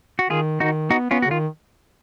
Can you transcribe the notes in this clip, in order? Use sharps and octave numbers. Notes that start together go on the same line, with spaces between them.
F#4
D#3 F4 G#4
D#3 D#4 F#4
B3 D#4 F#4
B3 C#4 F4
F#4
C#3
D#3 F4